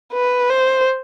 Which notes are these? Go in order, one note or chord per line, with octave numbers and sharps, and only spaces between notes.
B4
C5